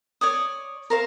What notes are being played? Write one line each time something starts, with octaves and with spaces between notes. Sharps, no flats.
C#5 D5 D#6
A#4 C5 F5